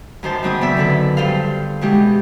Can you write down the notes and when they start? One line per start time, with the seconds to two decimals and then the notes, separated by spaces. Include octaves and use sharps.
0.23 F#2 D#3 C5 A5
0.43 C#3 F#3 C4 D#6
0.61 B3 D5 E5
0.77 D3 D#3 A4 B4
1.17 G2 F4 A4 C5 F5
1.81 B2 E3 G#3 G4